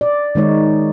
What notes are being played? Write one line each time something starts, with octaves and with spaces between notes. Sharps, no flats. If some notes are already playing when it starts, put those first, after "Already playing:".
D5
D#3 G#3 D#4 C#5